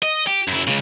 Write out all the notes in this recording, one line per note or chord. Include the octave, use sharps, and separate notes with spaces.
D#5
G4
F#2 E4
C#2 C#3